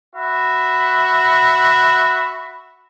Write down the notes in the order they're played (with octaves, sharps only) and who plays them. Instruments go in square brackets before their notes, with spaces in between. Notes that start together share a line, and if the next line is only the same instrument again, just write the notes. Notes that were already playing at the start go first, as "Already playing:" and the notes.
[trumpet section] F#4 E5 B5